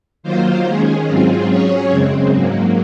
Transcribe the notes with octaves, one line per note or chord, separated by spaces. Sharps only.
D#3 F#3 A#3 F4 C5
D#3 G#3 C#4 G#4
G#2 F#3 C4 F4 G#4
F#3 C#4 G#4 C#5
F#2 C#3 G#3 C4
G#2 F#3 A#3